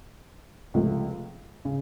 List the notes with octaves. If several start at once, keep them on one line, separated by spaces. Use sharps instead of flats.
C#2 C3 F3 A3
C#3